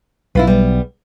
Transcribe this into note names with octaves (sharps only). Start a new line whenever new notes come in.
B1 E4 F4 B4
G3 B3